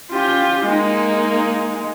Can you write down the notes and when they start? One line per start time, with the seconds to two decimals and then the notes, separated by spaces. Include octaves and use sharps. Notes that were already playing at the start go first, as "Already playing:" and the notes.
0.11 C#4 F4 G4
0.65 G#3 A#3 D#4